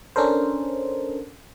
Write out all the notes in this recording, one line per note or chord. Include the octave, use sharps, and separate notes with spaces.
C#4 D4 A4 A#4 C5